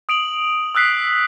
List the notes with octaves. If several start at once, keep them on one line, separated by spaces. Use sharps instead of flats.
D#6 D7 F7 F#7
D#6 E6 F#6 B6 C7